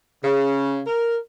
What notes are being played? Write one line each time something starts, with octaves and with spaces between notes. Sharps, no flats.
C#3
A#4